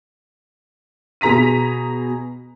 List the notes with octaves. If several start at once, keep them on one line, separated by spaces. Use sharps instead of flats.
B2 G#4 A#5 B6 D#7